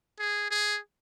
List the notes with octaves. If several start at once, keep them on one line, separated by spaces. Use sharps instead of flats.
G#4
G#4